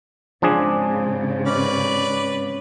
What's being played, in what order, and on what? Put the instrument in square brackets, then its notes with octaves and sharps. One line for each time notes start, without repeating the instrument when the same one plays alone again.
[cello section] G#2 C#3 C4 [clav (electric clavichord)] F3 D4 G#4
[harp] C#4 [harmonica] B4 D5